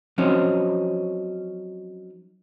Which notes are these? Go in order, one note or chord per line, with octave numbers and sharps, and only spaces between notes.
F3 F#3 C4 C#4 D#4